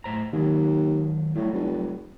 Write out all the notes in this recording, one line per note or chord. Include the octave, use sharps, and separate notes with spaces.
A2 C5 A#5
D#2 D#3 F#3 G#3
A2 F#3 G3
F1